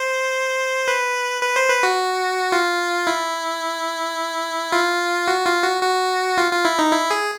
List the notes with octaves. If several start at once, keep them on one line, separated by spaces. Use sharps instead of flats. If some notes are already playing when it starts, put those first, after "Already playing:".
Already playing: C5
B4
B4
C5
B4
F#4
F4
E4
F4
F#4
F4
F#4
F#4
F4
F4
E4
D#4
E4
G#4